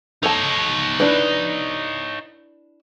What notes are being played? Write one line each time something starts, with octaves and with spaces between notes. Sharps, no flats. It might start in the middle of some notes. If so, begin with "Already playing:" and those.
D#4 A4 C#5 A5
D4 E4 B4